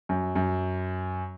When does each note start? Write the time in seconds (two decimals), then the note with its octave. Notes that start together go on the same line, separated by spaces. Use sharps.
0.09 F#2
0.35 F#2